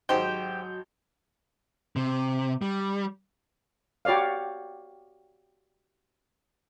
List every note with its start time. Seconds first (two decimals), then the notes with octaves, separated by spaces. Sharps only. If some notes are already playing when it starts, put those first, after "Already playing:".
0.09 G#1 F#3 D#4 F#4 G4 C5 G5 G6
1.96 C3
2.62 G3
4.05 F#4 G4 C#5 D5 F5